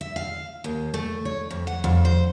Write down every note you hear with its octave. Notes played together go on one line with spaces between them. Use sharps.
E5
F5
D#2
A3
C#5
F2
F#5
F2
C5